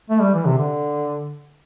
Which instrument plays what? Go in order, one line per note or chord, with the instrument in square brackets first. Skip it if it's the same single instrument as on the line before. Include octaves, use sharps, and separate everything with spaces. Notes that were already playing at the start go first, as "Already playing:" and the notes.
[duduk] A3
G3
E3
C3
D3